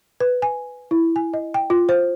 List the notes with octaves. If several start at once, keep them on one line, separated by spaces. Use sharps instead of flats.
B4
G#5
E4
G#5
D#5
G5
F4
C5